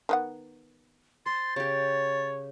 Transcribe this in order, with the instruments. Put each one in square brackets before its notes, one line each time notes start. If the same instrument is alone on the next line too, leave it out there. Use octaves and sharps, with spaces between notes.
[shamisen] D#3 B3 F#5
[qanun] C5 [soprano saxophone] C6 [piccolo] A6
[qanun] C#3 G4 [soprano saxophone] C#5